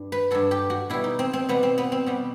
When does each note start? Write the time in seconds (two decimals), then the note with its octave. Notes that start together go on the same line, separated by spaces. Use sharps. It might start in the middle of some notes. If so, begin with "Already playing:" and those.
Already playing: G2
0.12 B4
0.31 G2 F#3 A4
0.51 G4
0.70 F#4
0.90 B2 G3 E4
1.04 D#4
1.19 C4
1.33 C4
1.49 B2 G3 B3
1.63 C4
1.78 B3
1.92 C4
2.06 B2 G3 B3